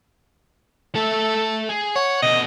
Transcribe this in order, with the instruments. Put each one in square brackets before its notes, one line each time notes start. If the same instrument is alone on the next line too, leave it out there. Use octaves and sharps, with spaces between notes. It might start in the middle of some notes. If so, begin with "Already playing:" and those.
[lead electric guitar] A3 E5 [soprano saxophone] A4
[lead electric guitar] G#4
[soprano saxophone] C#5 [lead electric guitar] F#5
[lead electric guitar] B2 D3 [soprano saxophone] D#5